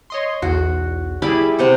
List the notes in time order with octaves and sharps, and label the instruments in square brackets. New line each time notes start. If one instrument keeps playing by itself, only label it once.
[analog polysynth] C#5 D#5 C6
[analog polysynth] B1 E2 [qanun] F#4
[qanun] G3 B5 D6 [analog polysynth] E4 G#4
[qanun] C3 C5 F#5